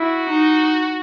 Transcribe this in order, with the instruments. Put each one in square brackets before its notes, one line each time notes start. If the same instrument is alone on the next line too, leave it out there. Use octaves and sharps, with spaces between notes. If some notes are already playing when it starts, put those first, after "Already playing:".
Already playing: [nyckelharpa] E4 [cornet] F#4
[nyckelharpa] D#4